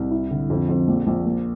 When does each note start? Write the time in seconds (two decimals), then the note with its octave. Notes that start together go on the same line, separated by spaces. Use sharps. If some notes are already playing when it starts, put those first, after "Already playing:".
Already playing: C2
0.11 E4
0.30 D3
0.50 F2
0.69 F2
0.88 A#1
1.07 A#1
1.25 A#3